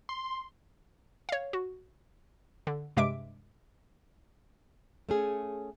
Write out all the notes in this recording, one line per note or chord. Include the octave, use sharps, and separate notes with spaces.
C6
C#5 F5
F#4
D3
G2 C3 G#3 E5 D6 D7
A3 C#4 G#4